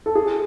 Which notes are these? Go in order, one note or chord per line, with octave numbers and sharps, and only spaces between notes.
A4
G#4